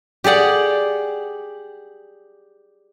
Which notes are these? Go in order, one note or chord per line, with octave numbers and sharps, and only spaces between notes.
G4 G#4 D5 F#5